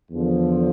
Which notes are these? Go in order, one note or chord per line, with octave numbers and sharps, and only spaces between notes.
E2 D3 F3